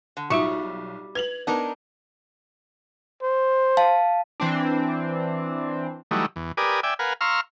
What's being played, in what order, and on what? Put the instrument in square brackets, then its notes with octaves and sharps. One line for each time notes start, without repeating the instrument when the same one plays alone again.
[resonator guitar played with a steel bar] D3
[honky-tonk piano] B1 [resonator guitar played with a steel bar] G3 [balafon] D#4 F4 F#4 [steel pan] E5 C#6
[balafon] B4 [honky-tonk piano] G#6 F7 F#7
[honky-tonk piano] B3 [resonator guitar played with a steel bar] D4 D#4 A#4
[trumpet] C5
[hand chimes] F5 A5
[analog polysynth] E3 C4 D4
[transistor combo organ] E3 F#3 G3 A3 D#4
E2
G4 A#4 B4 D5 G#5 D#6
D5 E5 G5 G#5
A#4 B4 F5 F#5 G#5
F5 A#5 C6 C#6 E6 F6